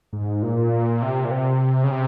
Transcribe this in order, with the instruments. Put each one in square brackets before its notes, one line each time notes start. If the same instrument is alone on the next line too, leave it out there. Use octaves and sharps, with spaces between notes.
[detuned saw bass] G#2
A#2
C3
A#2
C3
C#3
C3